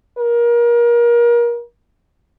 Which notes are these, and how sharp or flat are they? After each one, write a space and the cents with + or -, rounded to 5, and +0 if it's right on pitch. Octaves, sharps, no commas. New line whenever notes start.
A#4 +30